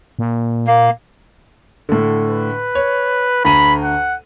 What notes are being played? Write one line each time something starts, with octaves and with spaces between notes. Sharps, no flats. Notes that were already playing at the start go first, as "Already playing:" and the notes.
A#2
A#3
A2 D3
B4
C#5
D2 A#5 B5 D#7
F#5